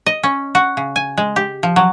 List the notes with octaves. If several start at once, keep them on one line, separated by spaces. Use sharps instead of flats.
D#5
C#4
F#4
C#3
G#5
G#3
G4
F3
F#3